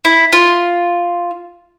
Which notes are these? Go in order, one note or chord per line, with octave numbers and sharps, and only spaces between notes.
E4
F4